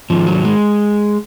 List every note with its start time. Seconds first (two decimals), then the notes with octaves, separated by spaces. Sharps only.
0.10 G#2 D#3 F3
0.27 F#3
0.45 G#3